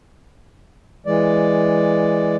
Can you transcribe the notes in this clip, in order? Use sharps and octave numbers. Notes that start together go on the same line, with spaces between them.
E3 G#3 D5